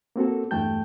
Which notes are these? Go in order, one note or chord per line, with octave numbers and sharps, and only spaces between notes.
A#3 C4 F#4 A4
E2 G2 A3 G5 A5 G6